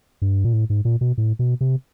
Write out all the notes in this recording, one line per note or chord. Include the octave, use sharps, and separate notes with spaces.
G2
A#2
A2
G#2
A#2
B2
A2
B2
C3